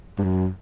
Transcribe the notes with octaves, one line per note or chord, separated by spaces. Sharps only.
G2
F#2